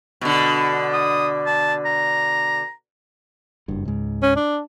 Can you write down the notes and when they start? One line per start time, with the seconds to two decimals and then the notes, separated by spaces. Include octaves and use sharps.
0.21 B2 D3
0.93 D#6
1.46 A5
1.85 A#5
3.68 F#1 G2
3.85 C#2 G#2
4.22 C#4
4.36 D4